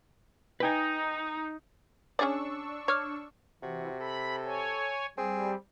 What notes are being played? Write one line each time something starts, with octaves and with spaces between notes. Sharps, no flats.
D#4 B4 G5 G#5
C#4 D4 G#4 C#5 D5 C#6 E6
C#5 D6 F6 G#6
C3 E3 F#4
A4 B5
C#5 G#5
G3 C4 G#4